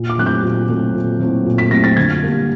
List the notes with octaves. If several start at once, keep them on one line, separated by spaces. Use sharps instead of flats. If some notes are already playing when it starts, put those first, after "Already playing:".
Already playing: A#2
D6
F#3 A3 C4 E4 F#6
G6
A#2
F#3 A3 C4 E4
A#2
F#3 A3 C4 E4
A#2
B6
F#3 A3 C4 E4 A#6
A6
D3 G#6
G3 A#3 D4